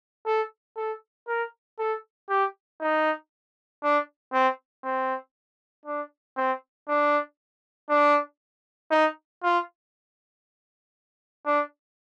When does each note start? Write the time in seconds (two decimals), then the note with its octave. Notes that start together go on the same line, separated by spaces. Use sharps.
0.26 A4
0.77 A4
1.27 A#4
1.79 A4
2.29 G4
2.81 D#4
3.83 D4
4.33 C4
4.84 C4
5.86 D4
6.36 C4
6.88 D4
7.89 D4
8.91 D#4
9.43 F4
11.46 D4